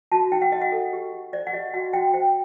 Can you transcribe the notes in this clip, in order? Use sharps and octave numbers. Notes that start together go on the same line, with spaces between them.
F#4 A5
D#4 G5
F#5
F#4 D#5
F#5
A4
G4
G4
C5 D5
F#5
G4 D#5
F#4 F#5
F#4 G5
C5 G5